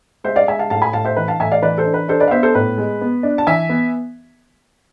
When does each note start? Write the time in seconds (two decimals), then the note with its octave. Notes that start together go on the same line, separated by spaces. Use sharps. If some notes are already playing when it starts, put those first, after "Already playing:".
0.24 G#3 C5 E5
0.36 D5 F5
0.47 G#3 E5 G#5
0.59 F5 A5
0.70 A2 F5 A5
0.82 G#5 B5
0.93 A2 F5 A5
1.05 C5 E5
1.17 E3 B4
1.28 F5 A5
1.40 A2 E5 G#5
1.52 D5 F5
1.62 E3 B4 D5
1.78 A4 C5
1.85 D4
1.94 B4
2.08 D4 A4 C5
2.20 B4 D5
2.28 F5
2.31 B3 C5 E5
2.43 A4 C5
2.55 A2 B4
2.78 G#3
3.01 B3
3.23 D4
3.38 A5
3.47 E3 E5 G#5
3.69 B3